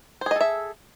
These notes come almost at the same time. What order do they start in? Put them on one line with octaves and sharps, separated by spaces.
C5 G#4 D#5 A4 E5